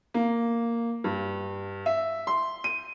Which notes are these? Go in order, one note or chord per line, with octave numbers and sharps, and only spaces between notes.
A#3
G2
E5
C6
D#7